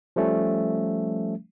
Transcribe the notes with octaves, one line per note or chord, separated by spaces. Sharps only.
F3 G3 A3 C#4